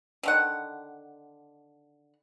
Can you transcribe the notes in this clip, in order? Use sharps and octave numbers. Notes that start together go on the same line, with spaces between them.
D3 D#3 F#5